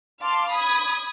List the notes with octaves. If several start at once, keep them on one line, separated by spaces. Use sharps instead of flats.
F5 A5 C6 D6
B5 D#6 G#6